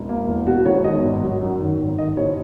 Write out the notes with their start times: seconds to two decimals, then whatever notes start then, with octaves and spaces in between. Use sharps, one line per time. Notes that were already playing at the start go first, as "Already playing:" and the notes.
Already playing: E1
0.09 A#3
0.28 E2
0.46 B2 F#4
0.65 E1 C#5
0.84 D#3 D#5
1.03 G#1
1.22 F#3
1.41 F#2
1.60 D#3
1.79 G#1
1.98 D#3 D#5
2.17 F#1 C#5